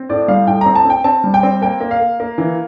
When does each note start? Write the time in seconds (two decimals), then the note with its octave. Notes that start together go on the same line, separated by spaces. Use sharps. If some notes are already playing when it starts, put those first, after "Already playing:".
Already playing: C4
0.09 A2 D5
0.28 G3 F5
0.47 A2 G5
0.61 C4 A#5
0.75 A5
0.85 C4 G5
1.04 C4 A5
1.24 G3
1.34 G5
1.43 C4
1.62 A#3 G5
1.81 A#3
1.91 F5
2.00 A#3
2.20 A#3
2.38 E3